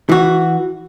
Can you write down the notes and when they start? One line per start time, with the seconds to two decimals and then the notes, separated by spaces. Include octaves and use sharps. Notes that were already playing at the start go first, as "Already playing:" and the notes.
0.09 E3 F#4